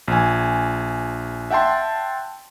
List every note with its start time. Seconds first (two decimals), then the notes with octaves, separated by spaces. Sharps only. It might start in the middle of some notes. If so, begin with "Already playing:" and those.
0.08 A#1 G#5
1.50 E5 F#5 G5 A5 C6